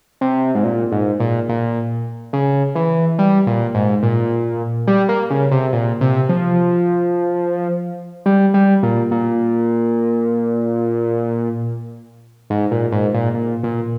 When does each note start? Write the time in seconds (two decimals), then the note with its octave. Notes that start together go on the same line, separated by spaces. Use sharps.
0.21 C3
0.55 G#2
0.64 A#2
0.92 G#2
1.20 A#2
1.49 A#2
2.33 C#3
2.75 E3
3.19 G3
3.47 A#2
3.74 G#2
4.03 A#2
4.87 G3
5.09 A#3
5.30 C#3
5.51 C3
5.73 A#2
6.01 C3
6.29 F3
8.26 G3
8.54 G3
8.83 A#2
9.11 A#2
12.50 G#2
12.71 A#2
12.92 G#2
13.14 A#2
13.34 A#2
13.63 A#2